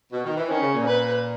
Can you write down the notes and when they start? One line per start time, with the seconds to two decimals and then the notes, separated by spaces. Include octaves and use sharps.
0.11 B2
0.24 D#3
0.37 E3
0.48 D#3 C#4
0.61 C#3
0.74 A#2
0.86 B4